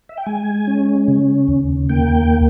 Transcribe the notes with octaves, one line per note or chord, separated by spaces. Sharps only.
E5
G5
G#3 G#5
C#4
C#3
D#2
A#3 G5